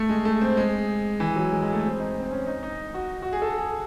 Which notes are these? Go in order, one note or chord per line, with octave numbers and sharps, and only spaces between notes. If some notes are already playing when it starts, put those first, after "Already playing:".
Already playing: A3
G#3
A3
C4
G#3
E3
F#3
G#3
G#3
A3
C4
D#4
C4
C#4
D#4
D#4
F#4
F#4
G#4
A4
G#4